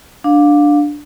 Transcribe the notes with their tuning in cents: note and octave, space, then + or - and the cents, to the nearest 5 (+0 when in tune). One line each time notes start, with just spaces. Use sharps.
D4 +5 F5 +25